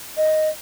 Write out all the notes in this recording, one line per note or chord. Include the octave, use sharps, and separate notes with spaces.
D#5